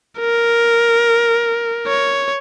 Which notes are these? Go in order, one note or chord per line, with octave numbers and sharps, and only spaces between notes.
A#4
C#5